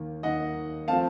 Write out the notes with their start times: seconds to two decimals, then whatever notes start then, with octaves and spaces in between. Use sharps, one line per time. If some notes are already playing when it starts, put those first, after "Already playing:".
Already playing: D#2 D#3 A#3
0.23 D#2 D#3 A#3 D#5 F#5
0.88 F3 A3 C4 F5 A5